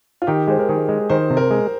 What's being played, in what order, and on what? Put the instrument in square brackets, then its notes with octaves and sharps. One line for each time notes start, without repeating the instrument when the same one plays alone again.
[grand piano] F4
[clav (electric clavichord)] D#3 [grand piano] G4
[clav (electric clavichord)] G#3 [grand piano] C5
[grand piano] A#4
[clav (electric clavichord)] D#3 [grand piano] G#4
[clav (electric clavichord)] G#3
[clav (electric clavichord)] D#3 [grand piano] C5
[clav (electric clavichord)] C3
[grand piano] A#4
[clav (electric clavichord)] G#3